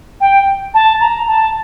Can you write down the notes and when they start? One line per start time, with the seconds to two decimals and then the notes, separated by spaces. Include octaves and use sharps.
0.21 G5
0.74 A5
1.01 A#5
1.27 A5